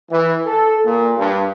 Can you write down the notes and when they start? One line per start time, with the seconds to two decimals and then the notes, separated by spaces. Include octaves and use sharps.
0.12 E3
0.46 A4
0.86 A#2
1.17 G2